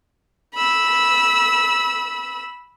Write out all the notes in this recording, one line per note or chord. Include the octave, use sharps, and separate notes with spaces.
B5 E6